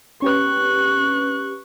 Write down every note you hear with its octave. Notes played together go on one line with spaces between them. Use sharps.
C#4 G4 B4 C#6 F#6